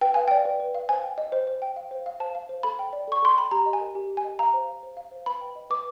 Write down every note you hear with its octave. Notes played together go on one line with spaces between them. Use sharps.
B4 G5
F5 G#5
D5 G5
B4
B4
F5
C5 G#5
G5
D#5
C5
C5
G5
F5
C5
F5
C5 A5
F5
C5
A4 B5
G5
D5
A4 C#6
A4 C6
G5 B5
G4 A#5
D#5
G#5
A#4
G4
G4
G#5
D#5
F5 A#5
C5
F5
C5
F5
C5
B4 B5
G5
D#5
B4 D6